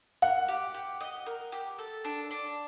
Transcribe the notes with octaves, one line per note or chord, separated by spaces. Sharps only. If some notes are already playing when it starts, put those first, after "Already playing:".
A#4 F#5
G4
G4
D#5
A#4
G4
A4
D4
D4